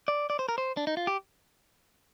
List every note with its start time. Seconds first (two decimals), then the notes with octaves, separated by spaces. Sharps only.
0.08 D5
0.30 D5
0.39 C5
0.49 A#4
0.58 C5
0.77 D4
0.87 D#4
0.97 F4
1.07 G4